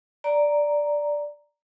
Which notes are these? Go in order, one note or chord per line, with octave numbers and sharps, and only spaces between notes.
D5 A#5